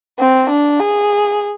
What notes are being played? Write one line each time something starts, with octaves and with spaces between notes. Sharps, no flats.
C4
D4
G#4